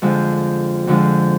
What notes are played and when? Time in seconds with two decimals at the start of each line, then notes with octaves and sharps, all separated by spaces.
0.02 F2 D3 F3 G#3
0.87 F2 D3 F3 G#3